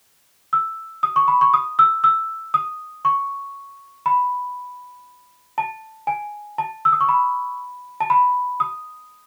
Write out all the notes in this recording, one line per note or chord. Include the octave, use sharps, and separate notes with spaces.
E6
D#6
C#6
B5
C#6
D#6
E6
E6
D#6
C#6
B5
A5
G#5
A5
E6
D#6
C#6
B5
A5
B5
D#6